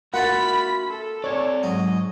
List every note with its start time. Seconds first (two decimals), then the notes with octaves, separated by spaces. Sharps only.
0.14 A#3 F4 F#4 E5 F#5 A5 B5 B6
0.89 A4
1.24 C4 C#5 D5
1.63 G#2 F#3 D#5